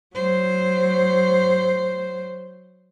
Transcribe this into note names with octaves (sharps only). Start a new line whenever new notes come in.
F#3 C5